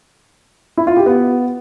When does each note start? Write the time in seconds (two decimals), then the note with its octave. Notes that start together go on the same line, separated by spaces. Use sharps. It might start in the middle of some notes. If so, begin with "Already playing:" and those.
0.77 E4
0.87 F4
0.97 G4
1.06 B3